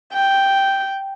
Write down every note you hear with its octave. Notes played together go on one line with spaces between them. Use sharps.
G5